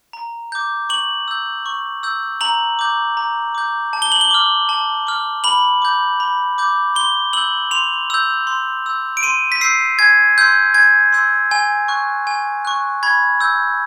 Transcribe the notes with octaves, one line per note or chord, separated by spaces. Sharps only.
A#5
D6 G6
C#6 F#7
E6 G6
C#6
E6 G6
A#5 F#7
D6 G6
A#5
D6 G6
A5
G7
F#7
G7
D6 F6
A5
D6 F6
B5 F#7
D6 G6
B5
D6 G6
C6 G7
E6 G6 F#7
C6 F7
E6 G6
C6
E6 G6
D7
C6 D#7
B6
E6 G6 C7
G#5 G#6
C6 E6 G6
G#5 G#6
C6 E6 G6
G#5
C#6 F#6
G#5
C#6 F#6
B5 G#6
E6 G6